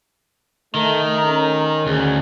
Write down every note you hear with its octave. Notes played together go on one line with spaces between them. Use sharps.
D#3 A3 A#5
C#4
D2 G#4